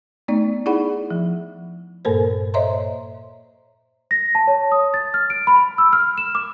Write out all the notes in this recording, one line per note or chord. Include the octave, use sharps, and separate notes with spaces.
A3 B3 D#4 D5
D#4 E4 G#4 D5 F#5 B5
F3
G2 A#2 A#3 A4 A#4 C5
C5 C#5 D#5 E5 A#5 C6
A#6
A5
C#5
D#6
A6
F6
D7
B5
E6
F6
E7
D6